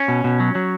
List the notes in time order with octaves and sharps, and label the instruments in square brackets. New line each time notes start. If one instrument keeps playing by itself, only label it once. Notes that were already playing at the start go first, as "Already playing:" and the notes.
Already playing: [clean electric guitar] C#4
B2
B2
F#3
F#3